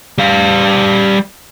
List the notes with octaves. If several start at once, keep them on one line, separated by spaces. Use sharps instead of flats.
G3 F5